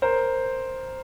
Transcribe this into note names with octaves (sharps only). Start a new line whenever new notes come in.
A#4 C5